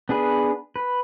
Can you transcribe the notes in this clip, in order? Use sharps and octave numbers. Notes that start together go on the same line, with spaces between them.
B3 D4 G#4 B4
B4